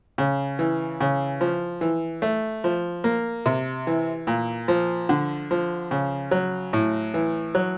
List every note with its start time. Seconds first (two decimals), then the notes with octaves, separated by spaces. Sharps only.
0.18 C#3
0.59 E3
1.00 C#3
1.41 F3
1.81 E3
2.22 A3
2.64 F3
3.04 A#3
3.46 C3
3.87 E3
4.27 A#2
4.68 F3
5.09 D3
5.51 F3
5.91 C#3
6.31 F#3
6.73 A2
7.14 E3
7.55 F#3